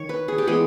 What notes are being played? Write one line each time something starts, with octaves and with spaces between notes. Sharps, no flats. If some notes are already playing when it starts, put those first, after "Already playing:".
Already playing: D#3 C#5
B4
G#4
G4
E3 G#3 B3 G#4